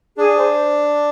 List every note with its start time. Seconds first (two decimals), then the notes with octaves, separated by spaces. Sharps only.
0.18 D4 G#4
0.39 C5